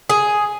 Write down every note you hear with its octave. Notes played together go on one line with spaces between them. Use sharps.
G#4